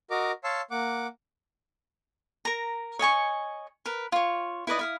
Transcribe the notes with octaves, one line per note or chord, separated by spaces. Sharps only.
F#4 A#4 D#5 D6
C#5 F5 A5 C6 E6
A#3 F#5 D6
A#4 A#5
C#5 D#5 G#5 C#6
A#4 B4
F4 C#5
E4 B4 D5 D#5
E4 F5 D#6